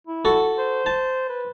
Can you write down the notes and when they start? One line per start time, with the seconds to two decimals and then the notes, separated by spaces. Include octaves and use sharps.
0.07 E4
0.25 F#4 A4
0.58 C5
0.86 A5
1.29 B4